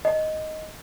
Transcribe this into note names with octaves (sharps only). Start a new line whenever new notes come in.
D#5